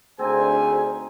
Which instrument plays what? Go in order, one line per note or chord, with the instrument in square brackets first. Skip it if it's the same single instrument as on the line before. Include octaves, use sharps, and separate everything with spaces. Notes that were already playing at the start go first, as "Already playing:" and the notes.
[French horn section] D2 G#4 [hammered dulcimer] C4 D#4 [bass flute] C5 [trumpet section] G#5